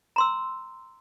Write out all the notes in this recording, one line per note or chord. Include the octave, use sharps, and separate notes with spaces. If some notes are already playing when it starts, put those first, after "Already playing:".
A#5 C6 E6